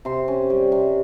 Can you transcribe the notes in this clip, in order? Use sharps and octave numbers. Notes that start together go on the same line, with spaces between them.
C3 C6
C#4
G3
C3